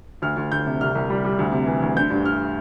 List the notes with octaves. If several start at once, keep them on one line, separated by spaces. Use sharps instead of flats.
D2 F6
D2
D2 G6
C3
C2 F6
C2
G3
G3
D2
C3
E3
D2
D3 G6
G2
G2 F6